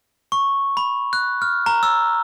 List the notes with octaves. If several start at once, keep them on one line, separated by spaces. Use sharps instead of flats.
C#6
B5
F#6
F6
A#5
E6